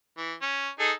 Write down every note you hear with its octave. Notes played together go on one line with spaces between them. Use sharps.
E3
C#4
D#4 G#4 A4